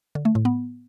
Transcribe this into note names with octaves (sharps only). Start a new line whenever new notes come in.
D3
A3
A2
B3